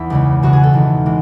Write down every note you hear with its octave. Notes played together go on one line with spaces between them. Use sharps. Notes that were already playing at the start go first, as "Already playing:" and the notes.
Already playing: E2 E4
C#2 C#3 G#3
E2 B2 G#3 F#4
G#4
A4
E2 D#3 G#3
E3 G#3